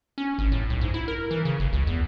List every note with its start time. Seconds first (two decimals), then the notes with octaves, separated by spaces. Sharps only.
0.18 C#4
0.38 G#1
0.52 A2
0.70 B1
0.81 G#2
0.94 E4
1.08 A#4
1.31 E3
1.45 C#3
1.59 F#1
1.73 C#2
1.87 E2